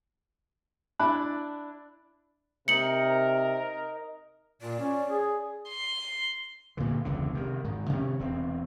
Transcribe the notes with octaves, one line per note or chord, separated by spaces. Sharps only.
D4 E4 D5 A5 B5 F#6
C3 D#4 A#4 D#5 C#7 F#7
A#2 D5
C#4
G#4
C6
G2 A#2 D3 E3
E1 C#2 D3
C3 D#3
G#2 D#3
C3 D#3 A#3 C#4
E1 C4